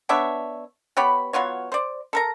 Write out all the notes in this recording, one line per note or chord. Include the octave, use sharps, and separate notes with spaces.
B3 D4 C#5 E5
B3 G4 C#5 B5
F#3 B3 F4 C#5
C5 D5
A4 A#4 A#5